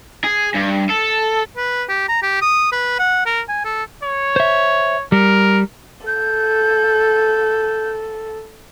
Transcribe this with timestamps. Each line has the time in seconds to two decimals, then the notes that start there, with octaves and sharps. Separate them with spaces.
0.24 G#4
0.54 G2
0.90 A4
1.57 B4
1.89 G4
2.09 A#5
2.22 G4
2.42 D#6
2.72 B4
2.99 F#5
3.26 A#4
3.49 G#5
3.65 A4
4.04 C#5
4.36 C5 E5
5.12 G3 A#4
6.07 A4 G6